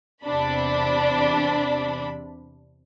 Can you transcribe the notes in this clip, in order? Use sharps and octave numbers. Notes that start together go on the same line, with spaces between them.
E2 C3 D4 B5